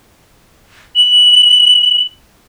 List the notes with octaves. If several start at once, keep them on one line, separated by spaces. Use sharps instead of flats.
F#7